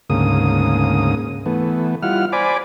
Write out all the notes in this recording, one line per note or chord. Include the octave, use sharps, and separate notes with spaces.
D2 G#2 C#3 A#3 D#6
E3 A3 B3
G3 E4 F4 F#5 F6
C5 D5 G#5 B5 D6